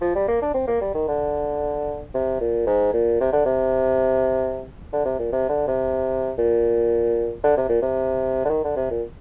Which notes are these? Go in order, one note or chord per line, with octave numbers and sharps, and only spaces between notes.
F3
G3
A#3
D4
C4
A#3
G3
D#3
D3
C3
A#2
G#2
A#2
C3
D3
C3
D3
C3
A#2
C3
D3
C3
A#2
D3
C3
A#2
C3
D3
D#3
D3
C3
A#2